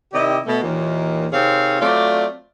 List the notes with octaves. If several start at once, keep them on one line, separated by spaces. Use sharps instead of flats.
C3 D#3 E4 G4 D5 D#5
B2 A3
D#2 A#2 D#3 E3
C3 D#3 C4 G#4 C#5 F5
F#3 A3 C4 F4 D5